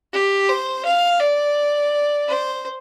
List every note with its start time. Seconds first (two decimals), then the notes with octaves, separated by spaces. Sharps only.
0.13 G4
0.49 C5
0.85 F5
1.20 D5
2.28 C5